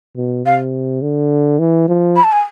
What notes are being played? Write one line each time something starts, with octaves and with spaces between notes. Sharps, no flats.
B2
C3 F5
D3
E3
F3
B5
A5
G#5